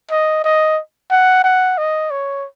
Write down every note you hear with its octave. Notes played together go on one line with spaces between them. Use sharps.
D#5
D#5
F#5
F#5
D#5
C#5